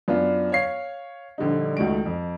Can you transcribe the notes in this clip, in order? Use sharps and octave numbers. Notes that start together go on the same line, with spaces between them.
F#2 B3 D4 F4
C#5 F5 C7
A#1 D3 G3 D#4
C#2 D#3 A3 F#4 D7
F2